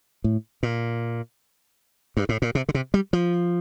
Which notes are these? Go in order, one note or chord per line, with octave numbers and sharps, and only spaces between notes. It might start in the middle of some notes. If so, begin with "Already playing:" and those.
A2
A#2
G2
A2
A#2
C3
D3
C3
G3
F3